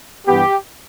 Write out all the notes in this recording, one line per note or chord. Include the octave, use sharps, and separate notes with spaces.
G2 E3 B3 G4